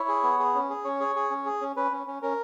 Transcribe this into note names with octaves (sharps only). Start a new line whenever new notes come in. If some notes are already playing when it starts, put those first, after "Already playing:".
Already playing: E4 C#5
G#4
B3
G#4
C#4
G#4
C#4 C#5
G#4
G#4
C#4
G#4
C#4
C#4 B4
C#4
C#4
C#4 A#4